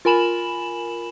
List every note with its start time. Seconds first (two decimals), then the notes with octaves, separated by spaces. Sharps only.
0.05 F4 A#4 G#5 B5 E7 F#7